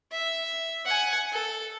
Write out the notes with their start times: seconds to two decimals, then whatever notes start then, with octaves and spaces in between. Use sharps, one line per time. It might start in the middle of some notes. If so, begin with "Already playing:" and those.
0.12 E5
0.86 F#5 G#5
1.32 A4